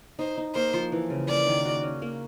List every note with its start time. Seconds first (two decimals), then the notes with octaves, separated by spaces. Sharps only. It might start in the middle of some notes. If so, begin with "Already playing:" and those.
0.19 D#4 C5
0.37 D#4
0.55 A#3 C5
0.74 F3
0.92 E3
1.10 C#3
1.28 A#3 D5
1.47 D#3
1.65 F#4
1.83 C#4
2.02 A#3